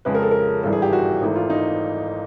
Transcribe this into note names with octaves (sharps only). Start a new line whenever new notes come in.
F2 C#3 F3 G#3 B4
A#4
A4
A#4
G#1 G2 E3 A4
G#4
G4
F#4
G#1 G#2 E3 A3
F4
D#4